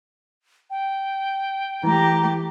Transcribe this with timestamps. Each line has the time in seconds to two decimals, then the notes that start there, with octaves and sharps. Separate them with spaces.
0.70 G5
1.83 E3 A3 G4 A#5